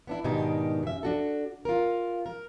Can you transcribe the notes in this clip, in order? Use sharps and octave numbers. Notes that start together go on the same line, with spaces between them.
B3 D4 E4
G#2 B2 D#3 D4 D#4 G4
F#2 E5
D4 F#4 A4
F4 A#4
A#4